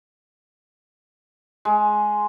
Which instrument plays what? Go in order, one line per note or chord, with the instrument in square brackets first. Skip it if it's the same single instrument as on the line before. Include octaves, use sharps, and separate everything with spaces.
[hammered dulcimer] G#3